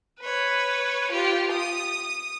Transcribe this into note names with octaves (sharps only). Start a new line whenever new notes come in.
B4 C#5
F4 G4
D#6